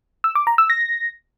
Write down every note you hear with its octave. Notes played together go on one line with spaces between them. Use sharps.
E6
D6
A#5
E6
A#6